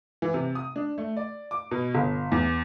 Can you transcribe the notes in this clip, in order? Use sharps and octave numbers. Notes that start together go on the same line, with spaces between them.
E3
C3
D#6
D4
A3
D5
D6
B2
G1
E2